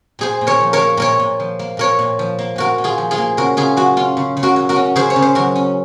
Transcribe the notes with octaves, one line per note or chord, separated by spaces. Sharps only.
A#2 G#4 C5
A#2
A#4 C#5
F3
A#4 C#5
A#3
A#2 A#4 C#5
A#2
F3
A#3
A#2 A#4 C#5
A#2
F3
A#3
A#2 F#4 A#4
A#2
F4 G#4
F3
F4 G#4
A#3
C#3 F#4 A#4
C#3 F4 G#4
F#3 F#4
C#4 F4
C#3
C#3
F#4 A#4
F#3
F#4 A#4
C#4
C#3 G#4 C5
C#5
C#3
C5
F#3 F#4 A#4
C#4